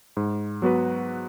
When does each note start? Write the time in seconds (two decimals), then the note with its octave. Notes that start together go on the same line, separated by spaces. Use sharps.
0.17 G#2
0.62 F#3 B3 F#4 B4